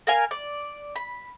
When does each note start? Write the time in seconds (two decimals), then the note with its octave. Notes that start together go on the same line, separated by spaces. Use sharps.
0.07 A#4 F5 G#5
0.31 D5
0.96 B5